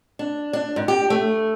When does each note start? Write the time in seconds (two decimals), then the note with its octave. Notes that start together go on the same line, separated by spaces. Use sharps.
0.19 D4
0.53 D4
0.76 G#2
0.88 G4
1.10 A3